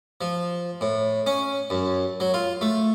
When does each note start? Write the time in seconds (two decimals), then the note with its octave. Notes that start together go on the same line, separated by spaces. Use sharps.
0.21 F3
0.81 A2
1.26 C#4
1.70 F#2
2.20 F#3
2.34 F4
2.61 A3